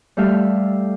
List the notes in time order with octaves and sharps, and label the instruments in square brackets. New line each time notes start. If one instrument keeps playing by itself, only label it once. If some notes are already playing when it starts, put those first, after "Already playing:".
[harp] G3 A3 G4 A4 E5 F5